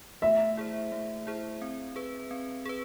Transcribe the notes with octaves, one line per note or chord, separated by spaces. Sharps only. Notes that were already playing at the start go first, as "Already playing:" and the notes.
A3 E5
E4 G#4 C5
A3
E4 G#4 C5
C4
G#4 B4
C4
G#4 B4